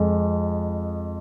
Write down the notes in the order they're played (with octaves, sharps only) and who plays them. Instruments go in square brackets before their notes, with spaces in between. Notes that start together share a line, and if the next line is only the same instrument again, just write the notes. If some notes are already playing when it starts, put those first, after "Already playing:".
Already playing: [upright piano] F2 G#3